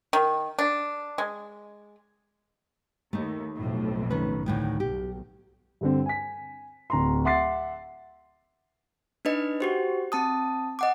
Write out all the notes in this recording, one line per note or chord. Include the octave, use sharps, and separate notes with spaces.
D#3
D4
G#3
D#2 A3 D#4
B1 F2 A2
D#3 C#4 B4
D2 A2 D#3
B1 G4
G2 D3 C4
G#5 B6
D1 A#5 C6
E5 F#5 C6 D6 A6 C7
D4 D#4 B4 D#5
F#4 G4 C5
C4 A5 D#6
D#5 F#5 D6